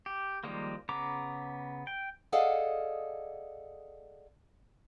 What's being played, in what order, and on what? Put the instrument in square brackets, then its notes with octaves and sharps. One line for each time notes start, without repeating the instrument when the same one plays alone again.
[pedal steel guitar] G4
D#3 F3 G3 G#3 A#3
C#3 B3 A#5 D6
G5
[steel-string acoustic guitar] G#4 A4 D5 D#5 F5 F#5